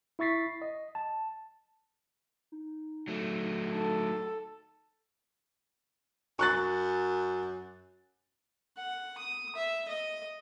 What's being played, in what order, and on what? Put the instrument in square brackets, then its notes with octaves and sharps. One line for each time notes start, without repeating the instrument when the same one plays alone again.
[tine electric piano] E4 E5 C#6 A6 B6 C7
D#5
A5
[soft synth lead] D#4
[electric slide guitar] F#3 A3
[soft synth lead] D#4 [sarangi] A4
[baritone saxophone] F#2 [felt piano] C#6 F#6 A6
[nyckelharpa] F#5
D#6
E5
D#5